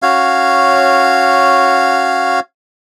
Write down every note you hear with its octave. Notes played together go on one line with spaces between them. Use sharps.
C#4 F#4 C#5 F5